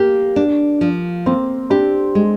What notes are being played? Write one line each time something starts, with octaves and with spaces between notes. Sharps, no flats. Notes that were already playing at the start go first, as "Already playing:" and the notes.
Already playing: A#3 G4
D4
F3
A#3 C4
D4 G4
G#3